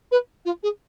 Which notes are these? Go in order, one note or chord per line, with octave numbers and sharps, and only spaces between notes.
B4
F4
G#4